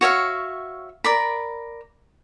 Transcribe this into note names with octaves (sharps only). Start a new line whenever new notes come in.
F#4 C#5 E5 F5
A#4 D5 B5